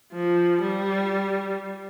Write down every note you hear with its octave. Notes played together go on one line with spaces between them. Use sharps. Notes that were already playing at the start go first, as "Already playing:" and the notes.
F3
G3